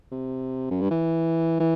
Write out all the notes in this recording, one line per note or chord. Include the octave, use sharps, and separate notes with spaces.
C3
F#2
G2
E3
E3